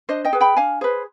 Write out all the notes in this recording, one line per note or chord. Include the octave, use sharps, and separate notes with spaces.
D4 C5 D#5
D#5 G5
G#4 B4
G5 B5
D4 F5 G#5
G#4 B4 C5